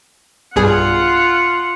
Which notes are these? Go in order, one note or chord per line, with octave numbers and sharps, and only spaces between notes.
B1 G2 F4 G#4 F#5